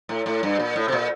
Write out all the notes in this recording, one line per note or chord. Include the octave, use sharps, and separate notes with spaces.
A2
A2
G2
A#2
A2
C3
A#2